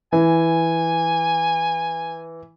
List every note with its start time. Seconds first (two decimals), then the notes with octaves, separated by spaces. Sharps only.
0.13 E3 G#5